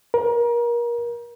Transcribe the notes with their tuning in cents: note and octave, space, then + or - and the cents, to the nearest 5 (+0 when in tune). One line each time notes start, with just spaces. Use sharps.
A#4 +30